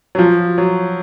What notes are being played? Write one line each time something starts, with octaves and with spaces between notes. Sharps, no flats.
F#3
F3
F#3